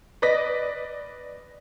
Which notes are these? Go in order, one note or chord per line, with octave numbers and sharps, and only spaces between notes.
B4 D5 D#5 A#6 B6